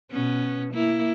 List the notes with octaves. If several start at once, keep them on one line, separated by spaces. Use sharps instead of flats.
B2 B3 C#4
A#3 E4